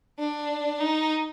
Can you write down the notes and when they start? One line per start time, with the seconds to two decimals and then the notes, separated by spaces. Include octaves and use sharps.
0.19 D4
0.80 D#4